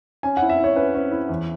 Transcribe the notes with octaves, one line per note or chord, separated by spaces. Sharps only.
C#4 G#5
E4 F#5
E5
E4
C#5
C#4 B4
C#4
E4
E2